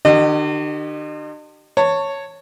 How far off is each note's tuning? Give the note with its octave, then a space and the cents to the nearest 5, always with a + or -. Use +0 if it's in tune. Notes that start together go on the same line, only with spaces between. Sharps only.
D3 +45 G4 -35 D#5 -35
C#5 +0 A5 +25